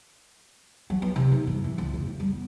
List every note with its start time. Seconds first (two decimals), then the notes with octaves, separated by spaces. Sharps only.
0.90 F#3
1.02 B3
1.16 C3
1.32 D#3
1.47 G2
1.64 E3
1.78 C#2
1.94 F1
2.07 F2
2.20 G3
2.32 B3